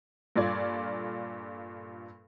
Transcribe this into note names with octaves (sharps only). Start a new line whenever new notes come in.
G2 A#2 F4 A4 D5 G#6